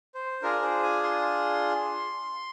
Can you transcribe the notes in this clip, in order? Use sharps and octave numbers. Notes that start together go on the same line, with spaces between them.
C5
D4 F4 G#4 A#4
C5
G#5
C6